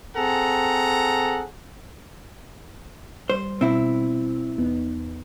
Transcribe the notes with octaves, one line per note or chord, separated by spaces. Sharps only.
C4 G#4 A4 F#5 A#5
G3 C5
B2 C4 E4
E2 B3 D#4